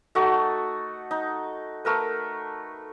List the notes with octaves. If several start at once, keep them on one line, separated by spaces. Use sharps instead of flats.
A3 D#4 F#4 A4
D#4
A3 A#4 B4